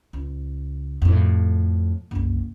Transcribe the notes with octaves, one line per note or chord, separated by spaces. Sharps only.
C#2
F2 A2
F#1 C2